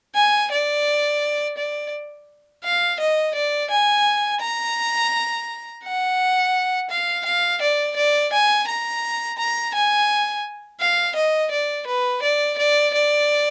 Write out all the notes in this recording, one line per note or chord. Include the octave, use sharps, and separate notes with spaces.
G#5
D5
D5
F5
D#5
D5
G#5
A#5
F#5
F5
F5
D5
D5
G#5
A#5
A#5
G#5
F5
D#5
D5
B4
D5
D5
D5